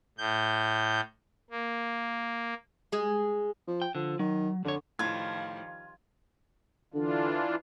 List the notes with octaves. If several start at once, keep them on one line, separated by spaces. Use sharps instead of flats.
A2 G6
A#3
G#3 G#4
F3
G5
D3 F3
D#3 F#3
F2 D3 C#5
A2 D#3 F3 G3 F4 G#6
D3 E3 D4 F4